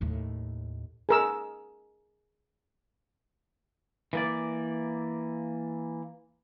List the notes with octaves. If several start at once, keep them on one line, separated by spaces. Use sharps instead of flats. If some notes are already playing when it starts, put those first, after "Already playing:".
D#2 A2
G#4 A#4 E6
E3 A#3 D5